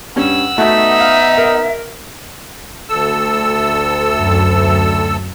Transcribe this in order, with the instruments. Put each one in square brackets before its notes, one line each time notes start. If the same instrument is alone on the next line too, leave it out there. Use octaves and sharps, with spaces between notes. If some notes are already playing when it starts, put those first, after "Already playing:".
[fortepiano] G2 C#4 [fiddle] F#5 E6
[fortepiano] A3 F#4 [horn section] B3 D#4 [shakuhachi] E5
[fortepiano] F5
A#4
[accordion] D2 A4 E6
[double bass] F#2